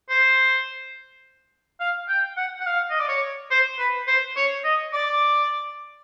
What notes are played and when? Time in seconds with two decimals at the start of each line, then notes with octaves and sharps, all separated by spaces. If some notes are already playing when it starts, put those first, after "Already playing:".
0.10 C5
1.80 F5
2.09 G5
2.37 F#5
2.60 F#5
2.66 F5
2.90 D#5
3.00 D5
3.08 C#5
3.51 C5
3.79 B4
4.08 C5
4.37 C#5
4.65 D#5
4.93 D5